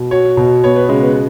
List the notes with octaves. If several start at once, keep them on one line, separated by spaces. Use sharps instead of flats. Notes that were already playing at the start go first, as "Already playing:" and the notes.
Already playing: B2
F#4 C#5
B2
B3 C#5
B4
C#3 G#3
B3